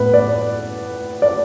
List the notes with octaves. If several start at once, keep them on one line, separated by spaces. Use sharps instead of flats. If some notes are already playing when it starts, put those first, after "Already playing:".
Already playing: A2 B3 B4
D5
D5